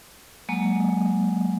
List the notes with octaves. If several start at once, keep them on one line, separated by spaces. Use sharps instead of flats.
F#3 G#3 A#3